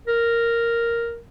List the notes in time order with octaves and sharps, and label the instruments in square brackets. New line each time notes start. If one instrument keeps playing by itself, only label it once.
[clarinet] A#4